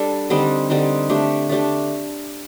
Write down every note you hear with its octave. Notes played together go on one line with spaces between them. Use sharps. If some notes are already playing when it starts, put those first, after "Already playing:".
Already playing: G3 D4 A4
D3 G3 C4 D#4
D3 G3 C4 D#4
A3 D4 G4
A3 D4 G4